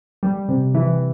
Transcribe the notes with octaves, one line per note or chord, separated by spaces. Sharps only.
G3
C3
E3